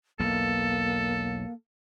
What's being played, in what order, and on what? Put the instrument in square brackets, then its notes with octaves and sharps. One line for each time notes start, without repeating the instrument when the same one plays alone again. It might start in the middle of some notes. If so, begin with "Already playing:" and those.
[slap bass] B1 E2 [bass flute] A#3 [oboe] A4